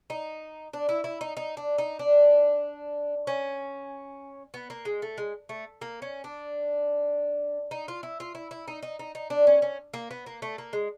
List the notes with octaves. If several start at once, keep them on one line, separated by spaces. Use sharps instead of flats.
D#4
D4
E4
E4
D#4
D#4
D4
D#4
D4
C#4
B3
A#3
G#3
A3
G#3
A3
A#3
C#4
D4
D#4
F4
E4
F4
E4
E4
D#4
D#4
D#4
D#4
D4
C#4
C#4
A#3
B3
A#3
A3
A#3
G#3